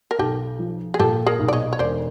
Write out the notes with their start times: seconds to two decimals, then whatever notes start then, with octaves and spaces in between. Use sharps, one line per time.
0.11 A#4
0.19 B1 G4 A4
0.59 F3
0.94 G#4
0.99 A#2 G4 A4
1.26 G#4 A#4
1.39 B1
1.48 D5
1.53 C#5 D#5
1.73 C#5
1.79 E1 C5 D5